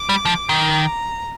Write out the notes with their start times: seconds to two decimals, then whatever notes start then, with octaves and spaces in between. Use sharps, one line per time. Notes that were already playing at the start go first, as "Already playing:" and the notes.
Already playing: D6
0.09 G3
0.25 F3
0.49 D#3
0.73 A#5